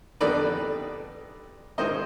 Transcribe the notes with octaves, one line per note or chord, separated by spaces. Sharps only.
F2 D3 G3 B3 D#4 B4 D5
G#2 D#3 G#3 C4 D#4 C5 D#5